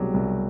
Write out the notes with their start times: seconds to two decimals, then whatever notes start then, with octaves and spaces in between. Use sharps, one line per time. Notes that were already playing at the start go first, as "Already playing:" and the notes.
Already playing: C2 B2 F#3 G4 G#4
0.14 C2